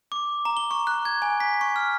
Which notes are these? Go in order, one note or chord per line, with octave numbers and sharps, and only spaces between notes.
D6
A#5
G7
C#6
F#6
G#6
G#5
B6
C#6
F6